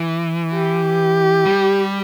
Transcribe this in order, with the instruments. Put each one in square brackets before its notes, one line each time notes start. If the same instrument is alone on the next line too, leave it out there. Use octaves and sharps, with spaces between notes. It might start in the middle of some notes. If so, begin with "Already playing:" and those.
Already playing: [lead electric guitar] E3
[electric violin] G4
[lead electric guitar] G3